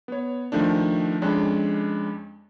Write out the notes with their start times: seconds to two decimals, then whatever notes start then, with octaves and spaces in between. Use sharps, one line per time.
0.08 B3 C#5
0.52 D#3 F3 A3 D4
1.22 F2 G#3 C#4 D4